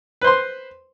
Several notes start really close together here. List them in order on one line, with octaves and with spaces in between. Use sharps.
B4 C5 C6